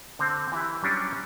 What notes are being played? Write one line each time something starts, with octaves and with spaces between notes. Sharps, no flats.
D3 C4
E3 E4 G4
F#3 G3 C#4 D4